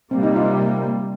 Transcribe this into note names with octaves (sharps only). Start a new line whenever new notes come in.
C3 G3 A#3 C4
D#4
F4